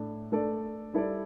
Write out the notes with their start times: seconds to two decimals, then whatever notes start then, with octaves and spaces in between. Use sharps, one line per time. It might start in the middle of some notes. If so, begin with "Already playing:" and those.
Already playing: A2 A3 D4
0.32 A3 D4 A4 D5
0.94 G3 E4 A4 D5